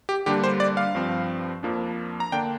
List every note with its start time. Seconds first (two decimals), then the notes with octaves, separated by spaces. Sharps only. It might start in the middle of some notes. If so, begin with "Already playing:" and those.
0.09 G4
0.26 D3 G3 A#3 D4 G4
0.44 C5
0.60 D5
0.77 F5
0.95 G2 F3 C4
1.63 F2 F3 A#3 D4
2.20 A#5
2.32 D3 A#3 D4 G5